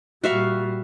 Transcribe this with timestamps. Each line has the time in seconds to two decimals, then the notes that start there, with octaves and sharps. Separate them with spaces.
0.24 A#2 G3 F#4 E5 F5